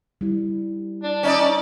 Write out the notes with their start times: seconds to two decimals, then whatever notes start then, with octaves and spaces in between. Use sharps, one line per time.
0.21 G3 E4
1.04 D4
1.23 C#4 D#4 D5